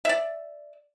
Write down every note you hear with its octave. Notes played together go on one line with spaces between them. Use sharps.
D5 E5